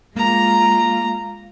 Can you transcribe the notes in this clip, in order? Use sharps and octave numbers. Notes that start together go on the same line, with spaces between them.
G#3 A#3 F4 A#5